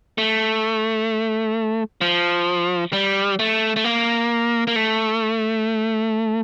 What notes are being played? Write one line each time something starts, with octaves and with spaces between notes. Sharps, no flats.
A3
F3
G3
A3
A3
A#3
A#3
A3